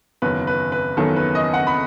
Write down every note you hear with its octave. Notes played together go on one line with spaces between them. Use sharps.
F#1 E2 D#3 F#3 B4
B4
B4
F#1 E2 D#3 F#3 A4
B4
D#5
F#5
B5